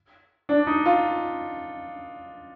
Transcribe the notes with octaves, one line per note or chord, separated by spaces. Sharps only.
D4
D#4
F4